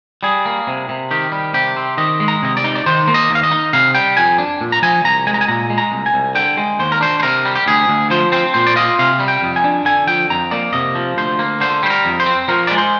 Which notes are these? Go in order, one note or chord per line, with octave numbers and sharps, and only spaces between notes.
G3 G#4
A#3
C3
C3
D#3 G4
G3
C3 G4
C4
D#3 D#5
G#3
A#5
C3 D#5
D5
D#4
D5
D#3 C5
A#3
D#5
D#2
F5
D#5
D#4
C3 F5
G3 G5
F2 G#5
D4
A#2
A#5
F3 G#5
C2 A#5
G#3 G#5
A#5
G#5
A#2 A#5
G#3
A#5
C2
G#5
C2
D3 G5
G#3
D#2 C5
A#4
D4 C5
C5
C3 A#4
G3
G4
D2 G#4
D2
F3 C5
C4 C5
A#2 C5
D5
F4 D#5
C3 F5
G3
G5
F2
G#5
D4
D3 G#5
F3 G5
F2 A#5
A#3 D5
C3 D#5
F3
D2 C5
A#3
D3 C5
G3 C5
A#4
F2
C5
C4
F3 A#4
G#3 D5
C5